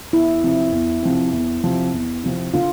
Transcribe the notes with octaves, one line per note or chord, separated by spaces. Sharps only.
E2 E4
C3 F3 C4
E2
C3 F3 C4
E2
C3 F3 C4
E2
C3 F3 C4
D3 F4